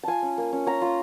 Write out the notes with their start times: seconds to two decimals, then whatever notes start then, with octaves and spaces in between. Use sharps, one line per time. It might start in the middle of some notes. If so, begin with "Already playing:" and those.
0.03 F4 G#5 A5
0.22 C#4
0.38 A#3
0.53 C#4
0.66 C#4 A#5
0.82 F4